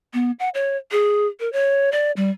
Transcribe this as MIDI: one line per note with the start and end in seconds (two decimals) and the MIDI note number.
0.14 0.31 59
0.39 0.49 78
0.54 0.77 73
0.91 1.27 68
1.40 1.51 70
1.53 1.90 73
1.92 2.12 74
2.17 2.30 55